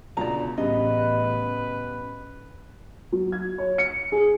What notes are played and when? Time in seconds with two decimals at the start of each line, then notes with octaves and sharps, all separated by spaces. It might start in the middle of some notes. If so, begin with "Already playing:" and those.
0.17 C#2 B2 D3 D5 A#5
0.58 A1 C#3 G3 B3 B4 D#5
3.12 F#3
3.32 G#6
3.58 C#5
3.78 C#7
4.12 G#4